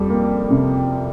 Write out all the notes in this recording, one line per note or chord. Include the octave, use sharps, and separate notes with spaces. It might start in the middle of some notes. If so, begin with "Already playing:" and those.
Already playing: F2 G3
A#3
C3